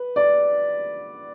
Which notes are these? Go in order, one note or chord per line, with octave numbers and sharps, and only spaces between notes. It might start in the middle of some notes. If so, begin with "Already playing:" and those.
Already playing: B4
D5